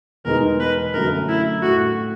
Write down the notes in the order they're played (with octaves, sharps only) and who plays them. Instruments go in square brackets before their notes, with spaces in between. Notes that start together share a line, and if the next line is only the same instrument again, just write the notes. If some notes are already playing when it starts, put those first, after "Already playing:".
[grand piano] E2 B2 G#3 B3 D#4 [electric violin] A#4
[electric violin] B4
[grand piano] F#2 D3 F#3 A3 [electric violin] A#4
[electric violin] E4
[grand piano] A2 F#3 A3 [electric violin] F#4